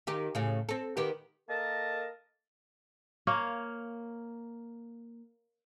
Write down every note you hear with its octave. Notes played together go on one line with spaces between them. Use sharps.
D#3 G4
A2 C#3
C4 A4
D#3 B3 G4
A#3 A4 A#4 D#5 A5
A#3 C#5 F5